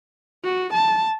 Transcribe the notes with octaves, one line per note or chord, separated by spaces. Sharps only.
F#4
A5